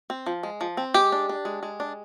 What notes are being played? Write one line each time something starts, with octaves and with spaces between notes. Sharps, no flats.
C4
F3
G#3
F3
C4
G#3 G4
D4
D4
G#3
G#3
D4